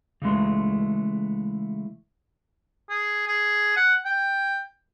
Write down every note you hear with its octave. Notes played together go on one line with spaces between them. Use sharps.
C#3 E3 G#3 A3
G#4
G#4
F#5
G5